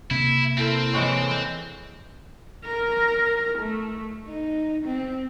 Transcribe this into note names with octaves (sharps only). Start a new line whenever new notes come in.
C3 A#3 E4
C4 E4 A4 A#4 C5
E3 G#3 C#5 F#5 B5
A#4
A3
D#4
C4